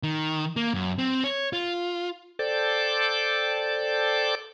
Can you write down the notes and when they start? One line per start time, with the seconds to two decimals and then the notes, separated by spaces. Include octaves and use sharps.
0.03 D#3
0.56 A#3
0.74 F#2
0.98 C4
1.24 C#5
1.53 F4
2.39 A4 C5 D5 G5 A5 D6